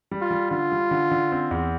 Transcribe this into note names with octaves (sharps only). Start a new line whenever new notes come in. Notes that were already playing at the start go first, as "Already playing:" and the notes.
G3
F4
G3
D3 F4
G3
D3
D3
C4
E2